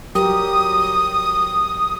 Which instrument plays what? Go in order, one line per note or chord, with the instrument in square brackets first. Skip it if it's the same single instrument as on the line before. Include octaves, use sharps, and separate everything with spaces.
[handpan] F#3 G4 A#4 [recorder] D#6